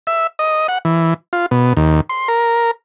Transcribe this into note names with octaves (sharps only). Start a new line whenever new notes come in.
E5
D#5
F#5
E3
F4
B2
D#2
C6
A#4